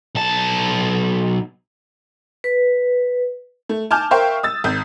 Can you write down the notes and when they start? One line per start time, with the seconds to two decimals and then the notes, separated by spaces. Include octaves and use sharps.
0.15 B1 A5
2.44 B4
3.69 A3
3.91 G#5 A5 D6 F6 G6
4.11 A#4 C5 E5 F5 G5 C#6
4.43 D#6 E6 A6
4.64 G#1 D#6 G6